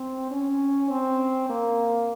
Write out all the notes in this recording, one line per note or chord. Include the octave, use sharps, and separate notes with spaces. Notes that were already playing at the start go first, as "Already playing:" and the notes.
Already playing: C4
C#4
C4
A#3